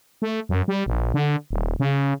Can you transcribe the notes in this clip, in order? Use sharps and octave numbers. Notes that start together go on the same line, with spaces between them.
A3
F#2
G3
A#1
D3
D#1
C#3